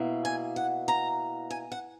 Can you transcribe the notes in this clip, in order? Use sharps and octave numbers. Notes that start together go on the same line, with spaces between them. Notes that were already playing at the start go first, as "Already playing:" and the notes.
Already playing: B2 A#3 E4
G#5
F#5
A#5
G#5
F#5